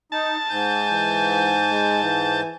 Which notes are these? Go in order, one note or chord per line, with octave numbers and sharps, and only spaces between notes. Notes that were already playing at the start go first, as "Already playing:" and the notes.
D#4 A5
G#2 G#5 G6
E3
G#3
E3